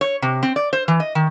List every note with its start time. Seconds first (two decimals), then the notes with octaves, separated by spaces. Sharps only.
0.01 C#5
0.22 C3
0.43 C4
0.56 D5
0.73 C5
0.88 E3
1.00 D#5
1.15 D#3